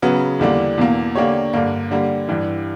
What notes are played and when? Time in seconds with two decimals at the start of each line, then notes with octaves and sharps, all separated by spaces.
0.02 C#3 F#3 B3
0.39 E2 D3 G3 A#3 D4
0.78 E2 B2 A#3
1.15 D3 A#3 D4 G4 C#5
1.54 G2 D3 A#3
1.91 D3 G3 A#3
2.29 G2 E3 G3